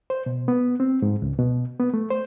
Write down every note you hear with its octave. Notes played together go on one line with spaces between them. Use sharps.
C5
B2
B3
C4
G#2
C#2
B2
B3
A3
C5